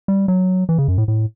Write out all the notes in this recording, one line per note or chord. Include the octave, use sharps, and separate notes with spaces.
G3
F#3
E3
C#3
F#2
A2
A2